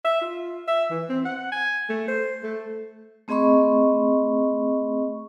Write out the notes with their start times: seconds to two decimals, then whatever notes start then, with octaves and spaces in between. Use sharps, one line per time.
0.04 E5
0.21 F4
0.68 E5
0.91 E3
1.09 C4
1.25 F#5
1.52 G#5
1.89 A3
2.08 C5
2.43 A3
3.28 A3 C4 G#4 D#5 B5 C#6